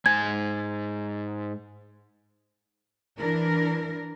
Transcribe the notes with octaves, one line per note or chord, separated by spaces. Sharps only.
G#2 G#5 G#6
E3 D4 A#4